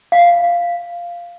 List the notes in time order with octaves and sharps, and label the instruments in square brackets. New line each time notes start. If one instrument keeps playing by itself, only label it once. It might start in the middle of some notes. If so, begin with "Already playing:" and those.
[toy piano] F5